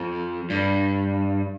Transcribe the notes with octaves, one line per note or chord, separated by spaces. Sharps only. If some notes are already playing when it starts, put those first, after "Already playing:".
Already playing: F2
G2